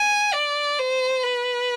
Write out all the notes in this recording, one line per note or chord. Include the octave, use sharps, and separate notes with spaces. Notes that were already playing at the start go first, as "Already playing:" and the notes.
Already playing: G#5
D5
C5
B4